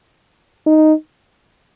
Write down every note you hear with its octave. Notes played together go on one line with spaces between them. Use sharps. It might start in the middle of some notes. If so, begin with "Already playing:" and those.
D#4